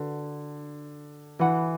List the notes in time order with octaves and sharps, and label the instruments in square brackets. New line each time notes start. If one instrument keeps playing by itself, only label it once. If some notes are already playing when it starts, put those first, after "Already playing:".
Already playing: [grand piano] D3 [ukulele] F#4 B4
[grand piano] E3 [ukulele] F#4 B4 F#5 B5